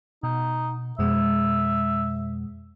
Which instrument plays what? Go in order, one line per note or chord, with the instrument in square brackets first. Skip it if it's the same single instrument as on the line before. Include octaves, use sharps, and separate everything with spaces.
[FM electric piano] B2 [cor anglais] D#4
[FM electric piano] F2 B2 G#3 [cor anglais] E5